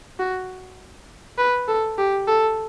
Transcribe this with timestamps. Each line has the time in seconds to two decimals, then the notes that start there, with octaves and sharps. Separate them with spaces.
0.19 F#4
1.38 B4
1.68 A4
1.98 G4
2.27 A4